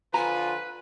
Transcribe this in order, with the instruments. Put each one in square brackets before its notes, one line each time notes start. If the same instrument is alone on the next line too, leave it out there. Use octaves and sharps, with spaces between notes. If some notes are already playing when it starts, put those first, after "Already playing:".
[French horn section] D3 F3 F4 [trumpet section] B4 [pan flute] G#5 [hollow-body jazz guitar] A#5